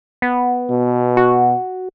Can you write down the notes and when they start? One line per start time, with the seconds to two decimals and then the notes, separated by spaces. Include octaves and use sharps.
0.22 B3
0.70 B2
1.17 F#4